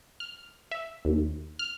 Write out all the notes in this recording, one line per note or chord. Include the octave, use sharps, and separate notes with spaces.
F6
E5
D#2
F6